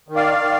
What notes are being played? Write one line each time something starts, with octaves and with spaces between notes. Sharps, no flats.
D#3
D5 F5
D#3